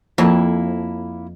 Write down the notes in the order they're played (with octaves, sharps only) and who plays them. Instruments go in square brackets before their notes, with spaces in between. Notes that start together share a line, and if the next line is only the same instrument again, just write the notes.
[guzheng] F2 [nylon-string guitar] A#3 E4 A5